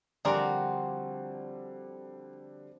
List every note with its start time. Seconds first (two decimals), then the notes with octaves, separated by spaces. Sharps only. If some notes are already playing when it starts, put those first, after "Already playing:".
0.25 D3 F3 G3 C4 F#4 G#4 A#4 D5